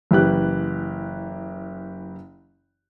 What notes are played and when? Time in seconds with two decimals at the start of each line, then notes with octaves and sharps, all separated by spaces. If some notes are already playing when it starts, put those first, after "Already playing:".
0.11 F#1 E3 G4 F#6